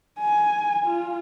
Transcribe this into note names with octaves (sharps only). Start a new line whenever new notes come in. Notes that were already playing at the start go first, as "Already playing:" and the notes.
G#5
F4